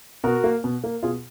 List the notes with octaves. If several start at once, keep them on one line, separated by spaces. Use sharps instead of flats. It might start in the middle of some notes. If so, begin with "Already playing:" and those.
B2 F#4 A#4
A#3
B2
A#3
B2 F4 G#4